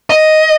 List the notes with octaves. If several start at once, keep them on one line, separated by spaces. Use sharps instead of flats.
D#5